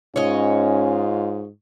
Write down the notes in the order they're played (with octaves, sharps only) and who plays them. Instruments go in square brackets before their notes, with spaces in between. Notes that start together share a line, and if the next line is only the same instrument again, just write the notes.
[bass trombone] G#2 [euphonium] C#4 [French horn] F4 [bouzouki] C#5 D#5